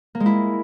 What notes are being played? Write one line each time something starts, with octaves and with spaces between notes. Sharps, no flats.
A#3
G#3
E4